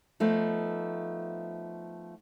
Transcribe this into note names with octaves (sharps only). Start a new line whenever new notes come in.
F3 A3 B3 D#4